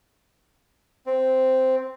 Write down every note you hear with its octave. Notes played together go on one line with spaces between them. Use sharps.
C4